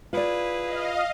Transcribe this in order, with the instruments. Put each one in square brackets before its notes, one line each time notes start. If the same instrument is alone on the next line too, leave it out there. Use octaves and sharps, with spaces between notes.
[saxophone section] E4 G#4 B4 [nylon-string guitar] F4 D5
[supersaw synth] D#5 F5